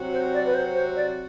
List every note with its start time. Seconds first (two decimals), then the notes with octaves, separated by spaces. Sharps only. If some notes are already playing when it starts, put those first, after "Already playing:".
Already playing: C3 F#3 C4 F#4
0.13 C5
0.34 D5
0.46 B4
0.54 C5
0.75 C5
0.96 D5